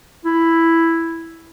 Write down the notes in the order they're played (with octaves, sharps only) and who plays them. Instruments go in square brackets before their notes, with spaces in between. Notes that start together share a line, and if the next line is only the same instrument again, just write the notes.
[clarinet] E4